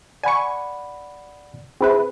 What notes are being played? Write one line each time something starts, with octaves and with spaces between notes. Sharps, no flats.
D5 F#5 G#5 B5 C#6
C4 E4 G#4 B4